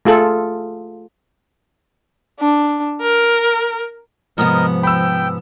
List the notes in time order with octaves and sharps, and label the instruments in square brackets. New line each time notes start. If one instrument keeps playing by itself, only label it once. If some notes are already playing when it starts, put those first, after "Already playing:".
[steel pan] A3 F4 G#4 A4
[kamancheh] D4
A#4
[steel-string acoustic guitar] G#2 C3 B3 [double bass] F3 [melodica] A#4 D#5
[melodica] G5 [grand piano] B5 E6